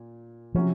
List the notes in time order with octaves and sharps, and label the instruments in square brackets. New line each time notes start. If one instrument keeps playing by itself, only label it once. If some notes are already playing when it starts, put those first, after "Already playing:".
Already playing: [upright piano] A#2
[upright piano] C3 F#3 C#4 F#4 [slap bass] F3